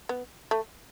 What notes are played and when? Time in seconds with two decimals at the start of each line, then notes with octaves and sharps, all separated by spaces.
0.09 B3
0.51 A3